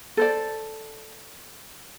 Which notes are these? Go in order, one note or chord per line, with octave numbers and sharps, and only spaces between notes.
A4 C5 D5